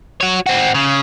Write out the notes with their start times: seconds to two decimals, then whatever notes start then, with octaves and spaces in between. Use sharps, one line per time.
0.21 F#4 C#5
0.47 C4 F#4
0.74 C#3